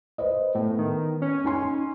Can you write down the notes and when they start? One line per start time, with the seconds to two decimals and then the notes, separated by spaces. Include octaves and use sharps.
0.18 B4 C5 D#5
0.55 A2 B3
0.78 D#3
1.22 C#4
1.44 D#4 G#5 C6